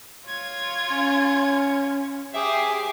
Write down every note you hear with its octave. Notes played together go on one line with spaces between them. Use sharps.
F4 C#5 G#6
C#4
G4 G#4 C5 E5 D6 C7